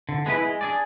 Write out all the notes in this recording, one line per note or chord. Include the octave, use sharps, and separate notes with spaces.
D3
G#3 B3 E4 B4
G#3
D4 G#4 D5